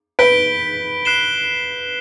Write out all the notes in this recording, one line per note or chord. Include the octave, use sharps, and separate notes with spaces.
B4 G6 B6 D7 G7
F#6 C7 E7 G7